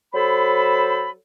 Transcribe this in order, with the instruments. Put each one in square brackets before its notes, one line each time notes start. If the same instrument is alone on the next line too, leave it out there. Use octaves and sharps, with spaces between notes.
[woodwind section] F#3 A4 C5 B5